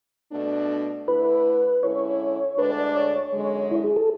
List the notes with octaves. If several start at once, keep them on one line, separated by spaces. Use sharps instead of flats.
B2 A3 D4
D3 A3 E4 B4
D3 G#3 C#4 E4 C#5
D2 D3 G#3 D4 B4
D5
D5
C#5
F#2 D3 G#3
E4
G#4
A4